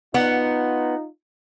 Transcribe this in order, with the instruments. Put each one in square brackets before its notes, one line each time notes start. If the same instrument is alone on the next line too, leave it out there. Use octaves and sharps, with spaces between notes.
[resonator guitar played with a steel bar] B3 F#5 [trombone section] D#4 F4